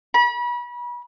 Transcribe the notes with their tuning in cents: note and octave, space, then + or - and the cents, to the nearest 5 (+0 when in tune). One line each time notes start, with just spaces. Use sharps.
B5 -35